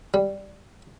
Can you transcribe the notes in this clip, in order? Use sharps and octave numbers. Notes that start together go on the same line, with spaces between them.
G3